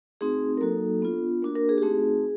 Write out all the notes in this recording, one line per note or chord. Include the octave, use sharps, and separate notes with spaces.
A3 C4 D#4 F#4 G#4
A#4
F#3 A#3 D#4 F#4 A4
B3 D4 F4
A#3 D4 F#4 A#4
A#4
G#4
G4
A3 C4 D#4 F#4 G#4